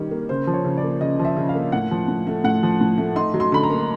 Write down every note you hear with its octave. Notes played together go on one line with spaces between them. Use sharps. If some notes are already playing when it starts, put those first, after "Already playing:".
Already playing: D#3 G3 C#4
A#3
C#3 C5
F3
C#5
C#3
D5
A#3
C#3 D#5
F3
E5
C#3
F5
A#3
A2 F#5
F3
A2
A3
A2 F#5
F3
A2
A3
D#4 C6
F#3
C6
D3 B5
A#5
A#3